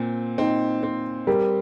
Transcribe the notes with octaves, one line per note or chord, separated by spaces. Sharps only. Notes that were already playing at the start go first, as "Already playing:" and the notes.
Already playing: A#2 C4
C4 D#4
C4
G3 G4 A#4